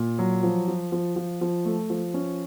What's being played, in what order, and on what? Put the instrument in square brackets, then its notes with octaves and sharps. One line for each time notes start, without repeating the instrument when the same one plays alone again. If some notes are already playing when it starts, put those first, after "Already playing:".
Already playing: [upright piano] A#2
F#3
F3
F3
F3
F3
F3
A3
F3
C#4